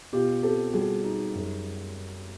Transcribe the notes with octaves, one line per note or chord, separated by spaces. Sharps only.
B2 F4 G4
C4 G4 A4
G3 F#4 G#4
D#4
F#2